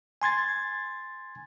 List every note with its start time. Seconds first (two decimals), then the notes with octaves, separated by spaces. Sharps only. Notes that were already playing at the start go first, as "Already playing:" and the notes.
0.22 G#5 C6 G#6 A6